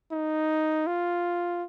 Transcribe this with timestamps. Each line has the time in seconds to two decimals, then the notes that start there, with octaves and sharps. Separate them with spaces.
0.12 D#4
0.87 F4